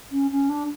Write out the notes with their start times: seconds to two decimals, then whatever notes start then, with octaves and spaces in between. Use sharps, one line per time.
0.12 C#4
0.31 C#4
0.49 D4